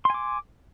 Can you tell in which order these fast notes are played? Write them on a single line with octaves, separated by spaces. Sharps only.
C6 G#5 D6